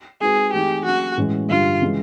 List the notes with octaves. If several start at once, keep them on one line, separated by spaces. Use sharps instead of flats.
G#3 C4 D#4 F#4 G#4 B4
E3 A3 C4 D#4 G4
F#3 A#3 C#4 F#4
A2 E3 G#3 C#4
G2 D3 G3 F4
C#3 E3 G#3